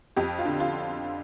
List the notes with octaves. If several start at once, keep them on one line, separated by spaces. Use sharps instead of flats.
F2 G4
F4
D3
F4